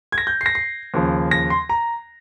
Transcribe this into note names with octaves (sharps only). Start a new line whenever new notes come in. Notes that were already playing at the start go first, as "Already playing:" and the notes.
G#6
A#6
G6
C7
A#6
C7
D#2 C#3 F3
A#6
C6
A#5